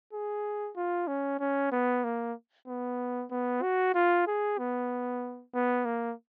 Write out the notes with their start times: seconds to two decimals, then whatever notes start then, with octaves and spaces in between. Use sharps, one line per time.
0.13 G#4
0.77 F4
1.08 C#4
1.40 C#4
1.72 B3
2.04 A#3
2.68 B3
3.31 B3
3.63 F#4
3.94 F4
4.27 G#4
4.58 B3
5.54 B3
5.85 A#3